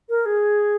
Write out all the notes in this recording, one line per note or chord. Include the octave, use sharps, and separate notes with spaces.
A#4
G#4